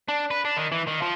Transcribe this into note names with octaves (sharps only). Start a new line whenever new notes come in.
D4
B4
D4
D#3
E3
D#3
F3